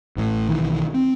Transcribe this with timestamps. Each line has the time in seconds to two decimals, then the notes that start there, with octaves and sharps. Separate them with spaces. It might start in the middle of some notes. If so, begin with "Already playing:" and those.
0.17 A1 A2
0.48 B1 D#3 E3
0.94 C4